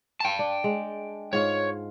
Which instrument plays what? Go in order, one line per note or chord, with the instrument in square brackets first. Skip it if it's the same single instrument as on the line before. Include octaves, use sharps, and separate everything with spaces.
[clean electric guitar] G5 A5
[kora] D4
G#3
[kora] G#2 F4 [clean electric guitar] C#5